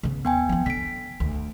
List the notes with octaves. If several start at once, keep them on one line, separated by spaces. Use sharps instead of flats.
C#3 B3
D#2 B3 G5 G#5
F3 C4
D3 B6 D7
D2